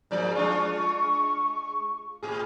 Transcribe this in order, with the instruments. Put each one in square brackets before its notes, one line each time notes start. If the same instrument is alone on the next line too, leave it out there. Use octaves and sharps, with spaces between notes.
[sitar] G#2 F3 A#3 [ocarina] D5
[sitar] G#3 D4 F4 [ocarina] C#6
[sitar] A2 G#4